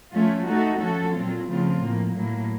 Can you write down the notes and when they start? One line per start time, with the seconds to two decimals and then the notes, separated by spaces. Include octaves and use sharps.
0.14 F3 A3 C#4 F4
0.47 A3 D#4 F#4 A4
0.80 F3 A3 C#4 F#4 A4
1.14 A#2 F#3 C4 F4
1.48 C#3 F3 A3 C4 F4
1.81 A2 F3 A#3
2.14 A2 F#3 A#3